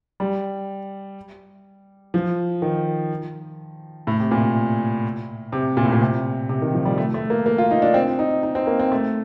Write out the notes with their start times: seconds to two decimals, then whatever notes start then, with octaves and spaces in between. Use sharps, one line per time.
0.20 G3
2.14 F3
2.62 D#3
4.07 A2
4.20 C3
4.31 A#2
5.53 C3
5.77 A#2
5.85 A2
5.92 A#2
6.01 C3
6.49 C3
6.62 D#3
6.74 F3
6.85 G3
6.98 A3
7.14 A3
7.30 A#3
7.46 A#3
7.58 F4
7.71 D#4
7.82 D4
7.94 C4
8.19 D#4
8.43 D#4
8.55 C4
8.67 A#3
8.79 C4
8.92 A3